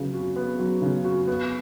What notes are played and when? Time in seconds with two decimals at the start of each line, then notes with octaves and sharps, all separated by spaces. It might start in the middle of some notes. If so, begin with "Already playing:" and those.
Already playing: C#3 F#3 B3
0.13 F#4
0.36 B3
0.59 F#3
0.82 C#3
1.04 F#4
1.27 B3